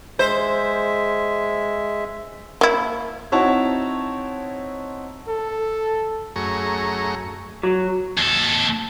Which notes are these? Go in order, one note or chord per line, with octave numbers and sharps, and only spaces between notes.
G#3 C5 E5
A#3 E4
C4 D#4 E4 F#4 C#5 A5
A4
F#2 A3 G#4 A#5 C#6
F#3
D#2 A4